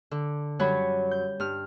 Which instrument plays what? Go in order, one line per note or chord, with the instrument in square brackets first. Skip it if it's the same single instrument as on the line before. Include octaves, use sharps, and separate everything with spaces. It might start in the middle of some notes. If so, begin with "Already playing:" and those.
[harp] D3
F#2 F#3 G3 F#4 C#5 B5
G6
G2 F6